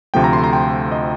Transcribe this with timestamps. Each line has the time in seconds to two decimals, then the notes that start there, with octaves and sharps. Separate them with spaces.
0.14 D2 C3 F3 A3 G5
0.24 A#5
0.33 C6
0.44 A#5
0.53 G5
0.92 D#5